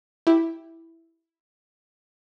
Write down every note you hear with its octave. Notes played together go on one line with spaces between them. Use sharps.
E4 G4